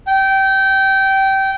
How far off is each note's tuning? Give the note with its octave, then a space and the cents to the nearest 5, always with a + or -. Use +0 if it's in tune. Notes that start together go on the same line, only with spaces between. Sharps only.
G5 -20